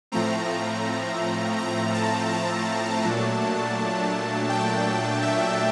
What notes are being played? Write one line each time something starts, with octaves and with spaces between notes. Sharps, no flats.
A2 F3 A3 C4 A#5
A#5
A5
A5
A#2 F#3 A3 D4
G5
E5